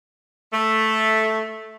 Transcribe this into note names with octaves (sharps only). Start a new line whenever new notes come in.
A3